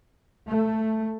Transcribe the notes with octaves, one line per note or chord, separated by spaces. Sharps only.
A3